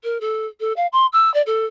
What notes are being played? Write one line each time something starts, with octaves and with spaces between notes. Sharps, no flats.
A#4
A4
A4
F5
C6
E6
D5
A4